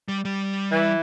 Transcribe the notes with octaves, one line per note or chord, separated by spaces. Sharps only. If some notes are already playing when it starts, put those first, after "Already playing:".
G3
G3
E3